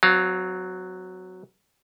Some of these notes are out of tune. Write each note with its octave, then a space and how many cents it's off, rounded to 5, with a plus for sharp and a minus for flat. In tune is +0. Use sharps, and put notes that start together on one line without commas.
F#3 +0 C4 -30 F5 +20